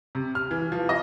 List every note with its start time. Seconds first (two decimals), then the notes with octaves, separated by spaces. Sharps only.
0.15 C3
0.35 F6
0.51 E3
0.72 F3
0.89 D#5